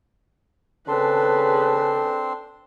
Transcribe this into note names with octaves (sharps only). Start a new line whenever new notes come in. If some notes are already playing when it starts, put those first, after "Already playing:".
C#3 C4 D4 G#4 A4 B4 C6